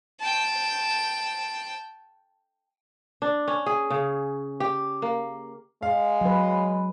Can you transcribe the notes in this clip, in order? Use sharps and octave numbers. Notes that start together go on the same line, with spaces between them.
G5 A5
D4
C#4
G#4
C#3
G4
A#3
G#3 F5
F#3 B4